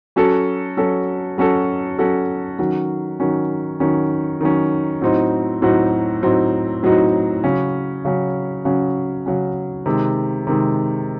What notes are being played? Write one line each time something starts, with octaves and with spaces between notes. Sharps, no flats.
F#3 C#4 F#4 A4
F#3 C#4 F#4 A4
F#3 C#4 F#4 A4
F#3 C#4 F#4 A4
D#3 F#3 C#4
D#3 F#3 C#4
D#3 F#3 C#4
D#3 F#3 C#4
A2 F#3 C4 D#4 F#4
A2 F#3 C4 D#4 F#4
A2 F#3 C4 D#4 F#4
A2 F#3 C4 D#4 F#4
C#3 F#3 C#4
C#3 F#3 C#4
C#3 F#3 C#4
C#3 F#3 C#4
C3 D#3 G#3
C3 D#3 G#3